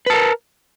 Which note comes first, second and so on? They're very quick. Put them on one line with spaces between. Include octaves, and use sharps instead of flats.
B4 A5 A#4